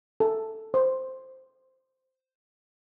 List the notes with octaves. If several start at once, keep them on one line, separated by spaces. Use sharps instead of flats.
A4
C5